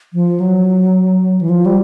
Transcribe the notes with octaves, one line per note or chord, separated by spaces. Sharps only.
F3
F#3
E3
F3
G3